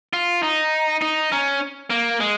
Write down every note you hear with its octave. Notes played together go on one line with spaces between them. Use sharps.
F4
D#4
D#4
C#4
A#3
G#3